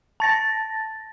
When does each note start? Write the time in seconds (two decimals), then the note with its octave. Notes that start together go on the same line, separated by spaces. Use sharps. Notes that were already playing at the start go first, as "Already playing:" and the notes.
0.20 A5 A6 A#6